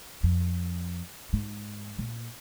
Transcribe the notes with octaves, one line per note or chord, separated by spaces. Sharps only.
F2
G#2
A#2